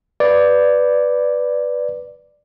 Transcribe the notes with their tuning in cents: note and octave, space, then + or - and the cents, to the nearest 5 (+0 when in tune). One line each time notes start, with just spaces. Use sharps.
B4 +0 D5 +0